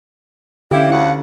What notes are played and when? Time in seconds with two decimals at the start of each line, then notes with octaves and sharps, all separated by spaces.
0.71 D3 E3 C#4 E4 G4 F5
0.90 D2 E4 F#5